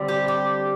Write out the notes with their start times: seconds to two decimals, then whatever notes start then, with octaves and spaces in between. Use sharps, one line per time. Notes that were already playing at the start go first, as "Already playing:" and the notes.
Already playing: D3 G3 C4
0.08 G4
0.28 G4